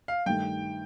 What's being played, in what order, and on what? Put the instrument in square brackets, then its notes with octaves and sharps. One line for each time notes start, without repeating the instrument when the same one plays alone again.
[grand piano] F5
[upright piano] G2 D#3 A3 [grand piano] G5